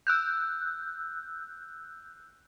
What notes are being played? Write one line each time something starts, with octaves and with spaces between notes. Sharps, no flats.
E6 F#6 G6